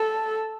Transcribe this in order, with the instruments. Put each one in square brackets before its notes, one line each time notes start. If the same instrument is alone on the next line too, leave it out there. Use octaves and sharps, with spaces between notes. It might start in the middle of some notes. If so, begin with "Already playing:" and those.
Already playing: [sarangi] A4